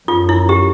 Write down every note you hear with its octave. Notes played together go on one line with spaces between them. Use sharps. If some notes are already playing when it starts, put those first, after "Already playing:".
F#2 F4
E4
G4